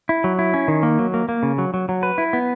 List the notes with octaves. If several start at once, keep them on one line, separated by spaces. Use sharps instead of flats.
E4
F#3
E4
C#4
D#3
A#3
F#3
A#3
A#3
C#3
F#3
F#3
F#3
B4
E4
B3